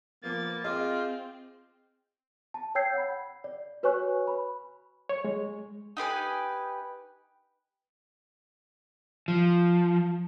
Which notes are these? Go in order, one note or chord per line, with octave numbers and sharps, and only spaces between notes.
F3 A#3 B3 D6 A6
C4 F4 G#4 D#5 D6
A5
C#5 G5 E6 G6 G#6 C7
F#5 B5
D5
F#4 B4 C#5 G#5 C#6 F#6
B5
C#5
G#3
D#4 G4 B4 G#5
F3